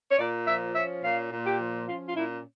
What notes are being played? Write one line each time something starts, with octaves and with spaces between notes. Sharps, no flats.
C#5
A#2 D5
F3 E5
C#4 E5
A#2 F5
A#2
G4
F3
C#4 F4
F4
A#2 E4